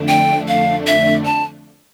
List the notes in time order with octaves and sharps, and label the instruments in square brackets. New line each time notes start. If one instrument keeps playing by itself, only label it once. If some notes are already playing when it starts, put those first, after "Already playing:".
Already playing: [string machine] F2 D3 A3 D4
[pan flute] G5
F5
E5
A5